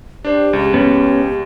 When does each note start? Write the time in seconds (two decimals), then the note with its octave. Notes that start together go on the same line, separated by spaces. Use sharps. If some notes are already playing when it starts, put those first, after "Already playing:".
0.25 D4 G4 C5
0.53 C#2
0.74 B3 C#4 G4